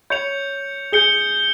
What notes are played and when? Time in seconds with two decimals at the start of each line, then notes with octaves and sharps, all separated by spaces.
0.10 C#5 G6 C#7 F7
0.92 G#4 G6 C#7 G7